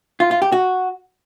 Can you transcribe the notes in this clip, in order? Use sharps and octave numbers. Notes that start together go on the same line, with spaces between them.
F4
F4
G4
F#4